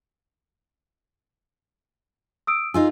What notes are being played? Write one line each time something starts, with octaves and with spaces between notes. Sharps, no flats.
D#6 E6 D7
D#4 F4 G#4 E6